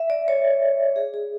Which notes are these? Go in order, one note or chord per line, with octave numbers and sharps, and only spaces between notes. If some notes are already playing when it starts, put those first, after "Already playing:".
Already playing: E5
D5
C#5
G#4
G#4